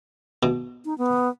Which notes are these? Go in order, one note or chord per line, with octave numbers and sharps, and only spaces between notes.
B2
D#4
B3